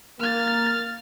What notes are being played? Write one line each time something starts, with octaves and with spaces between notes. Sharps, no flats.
A#3 F6 A6